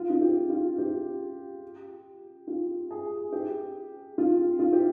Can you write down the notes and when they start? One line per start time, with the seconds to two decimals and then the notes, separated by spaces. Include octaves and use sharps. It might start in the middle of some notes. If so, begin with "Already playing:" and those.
Already playing: F4
0.10 F4
0.21 G4
0.50 F4
0.78 G4
2.47 F4
2.91 G#4
3.32 G4
4.18 F4
4.59 F4
4.73 G4